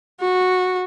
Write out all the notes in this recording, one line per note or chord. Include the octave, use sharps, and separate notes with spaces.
F#4